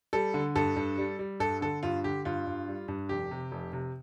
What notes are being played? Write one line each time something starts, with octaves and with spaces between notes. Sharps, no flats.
G3 A4
D3
G2 A4
G2
G3
G3
G2 A4
D3 A4
G2 F4
D3 G4
G2 F4
G2
G3
G2
F1 G4
C3
F1
C3